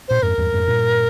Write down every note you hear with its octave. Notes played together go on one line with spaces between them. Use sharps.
A#2 C5
F2 G#2 A#4
E2 G2
F2 G#2
G2 A#2